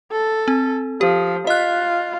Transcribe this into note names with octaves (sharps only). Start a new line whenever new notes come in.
A4
C4
F3 G4
F4 D#5 F#6